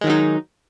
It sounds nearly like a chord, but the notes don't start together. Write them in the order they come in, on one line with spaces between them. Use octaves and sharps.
G#3 D#3 F#3 D#4